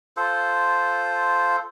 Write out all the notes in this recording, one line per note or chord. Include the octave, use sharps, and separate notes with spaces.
F4 A4 C5